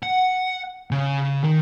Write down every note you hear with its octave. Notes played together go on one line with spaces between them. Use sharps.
F#5
C#3
D#3